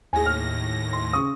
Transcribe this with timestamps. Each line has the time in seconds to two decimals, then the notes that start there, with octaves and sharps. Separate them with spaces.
0.13 D#2 A2 G#4 G#5 A#6
0.26 F6
0.93 C6
1.13 C#3 C#6 D#6